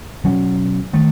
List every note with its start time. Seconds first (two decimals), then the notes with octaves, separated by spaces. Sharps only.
0.24 B2 F#3 C#4
0.93 D#3 A3